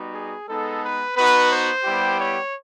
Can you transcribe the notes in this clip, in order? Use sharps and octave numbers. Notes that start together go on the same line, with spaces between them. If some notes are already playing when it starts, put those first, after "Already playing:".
Already playing: G3 B3 D#4 F#4
G#4
G#3 B3 D#4 A4
B4
B3 D#4 F#4 B4
C5
G3 B3 E4 G4
C#5